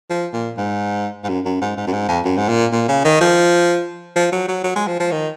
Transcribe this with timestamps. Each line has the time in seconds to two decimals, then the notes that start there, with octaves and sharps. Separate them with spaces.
0.10 F3
0.33 A#2
0.57 G#2
1.24 G#2
1.29 F#2
1.45 F#2
1.61 G#2
1.77 G#2
1.87 F#2
1.93 G#2
2.08 F2
2.25 F#2
2.37 G#2
2.48 A#2
2.72 A#2
2.88 C#3
3.05 D#3
3.21 F3
4.16 F3
4.32 F#3
4.48 F#3
4.64 F#3
4.76 G#3
4.88 F3
5.00 F3
5.12 D#3